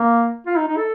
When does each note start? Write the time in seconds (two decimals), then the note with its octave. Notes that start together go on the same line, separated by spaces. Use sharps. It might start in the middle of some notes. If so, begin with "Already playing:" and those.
Already playing: A#3
0.47 F4
0.57 D#4
0.67 D#4
0.77 A4